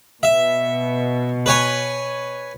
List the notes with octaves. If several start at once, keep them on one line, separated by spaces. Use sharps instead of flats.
B2 E5
B4 C#5 G#5